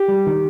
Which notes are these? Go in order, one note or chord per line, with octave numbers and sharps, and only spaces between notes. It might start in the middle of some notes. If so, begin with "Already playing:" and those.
Already playing: G4
G3
D#3